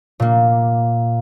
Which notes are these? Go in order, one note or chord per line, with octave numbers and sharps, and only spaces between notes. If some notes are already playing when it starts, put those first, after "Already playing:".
A#2 A#3